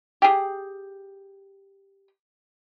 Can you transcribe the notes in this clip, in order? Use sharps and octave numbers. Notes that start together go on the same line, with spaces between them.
G4 G#4